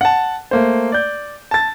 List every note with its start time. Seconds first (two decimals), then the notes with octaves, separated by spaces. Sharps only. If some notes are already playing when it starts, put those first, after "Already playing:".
0.01 F#5 A5
0.51 A3 A#3 C5
0.92 D5 G6
1.51 A5 A6